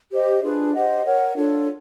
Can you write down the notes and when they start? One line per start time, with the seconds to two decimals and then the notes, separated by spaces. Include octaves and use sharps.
0.11 G4 C5 D#5
0.42 D4 F4 G#4 B4
0.74 G4 C5 D#5 F#5
1.04 A#4 C#5 F#5
1.36 D4 F4 A4 C#5